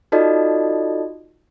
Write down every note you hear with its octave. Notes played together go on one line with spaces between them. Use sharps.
D#4 F4 F#4 A4 D5 D#5